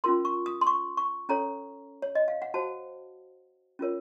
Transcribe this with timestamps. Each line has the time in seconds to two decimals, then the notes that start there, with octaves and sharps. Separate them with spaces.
0.04 C#4 F4 A#4 C6
0.25 C#6
0.46 D#6
0.61 C6
0.67 C#6
0.97 C#6
1.29 C#4 A4 C#5 A#5
2.02 C#5
2.15 D#5
2.28 F5
2.42 F#5
2.54 F#4 C5 A5
3.79 C#4 F4 A#4 C#5